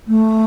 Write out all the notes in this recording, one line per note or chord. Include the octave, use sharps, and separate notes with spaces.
A3